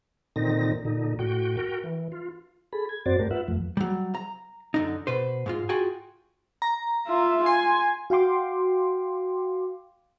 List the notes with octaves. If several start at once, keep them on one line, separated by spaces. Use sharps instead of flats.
A#2 D3 D#3 C4 D#4 A#6
A#2 D3 D#4
A2 F#4 G5
F#4 A#4 G5
E3
F4
G#4 A4 B5
G#6
F#2 C4 F#4 C5 D5 A6
G2 A3 G4 A#4
F4 B4 E5 F#5
F2 F3 A3
F#3 G3
A#5
F#2 D3 D#4
B2 B4 C5
G#2 G#3 F4
F4 F#4 G#4 G5 G#5
A#5
F4 E5
G#5 C6
F#4 F5 G5 C6 D6